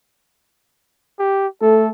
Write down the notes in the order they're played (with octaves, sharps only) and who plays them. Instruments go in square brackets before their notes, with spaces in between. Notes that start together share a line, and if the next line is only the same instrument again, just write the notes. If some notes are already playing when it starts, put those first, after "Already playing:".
[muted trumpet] G4
[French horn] A3 [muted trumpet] A4